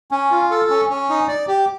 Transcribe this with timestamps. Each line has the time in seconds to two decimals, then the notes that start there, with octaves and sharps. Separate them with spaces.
0.11 C#4
0.31 F4
0.51 A4
0.70 C#4
0.90 C#4
1.10 D#4
1.28 D5
1.48 G4